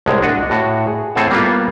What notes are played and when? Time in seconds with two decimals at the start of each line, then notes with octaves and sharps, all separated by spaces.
0.06 C2 A2 G#3
0.22 D4 F#4 D#5 F#5
0.50 A2 F#4
0.87 G#4
1.15 A2 C4 G#4 A4 F#5 A5
1.31 G3 A#3 B3 F4